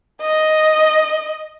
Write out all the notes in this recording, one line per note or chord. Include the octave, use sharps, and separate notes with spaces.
D#5